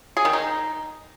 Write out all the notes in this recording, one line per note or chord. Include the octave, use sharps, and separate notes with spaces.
G#4
D#3
D#4